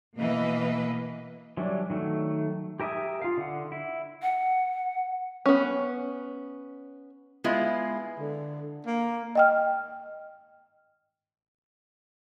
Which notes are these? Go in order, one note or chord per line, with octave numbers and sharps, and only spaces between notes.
B2 E3 A#3 B4 D#5
E3 F#3 G3 D4
D#3 F#3 A3
G4 A#4 E5 G#5 D#6
F4 F5
D3 F#5
E4
F#5
B3 C#4
G#3 B3 E4 F4 G#4
D3
A#3
D#5 G5 F6